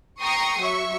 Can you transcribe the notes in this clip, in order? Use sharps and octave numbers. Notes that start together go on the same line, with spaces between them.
G5 A#5 C#6 D#6 C7
F#3 E5 C#6